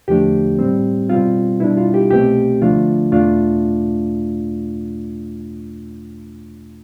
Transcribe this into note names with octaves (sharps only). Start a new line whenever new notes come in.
E2 D3 F3 A3 D4 G4
A2 G3 C4
B2 G3 C4 F4
B2 G3 D4 E4
F4
G4
C2 B2 A3 C4 G4
D2 D3 F3 A3 D4 F4
E2 B2 A3 D4 F4